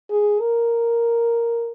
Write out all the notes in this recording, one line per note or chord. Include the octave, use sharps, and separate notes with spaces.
G#4
A#4